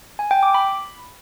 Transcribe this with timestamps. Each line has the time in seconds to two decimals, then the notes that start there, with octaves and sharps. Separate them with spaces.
0.19 G#5
0.31 G5
0.43 D6
0.54 B5